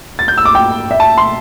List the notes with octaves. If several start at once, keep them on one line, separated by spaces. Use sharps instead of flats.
A6
G6
E6
D6
G5
E5
A5
C6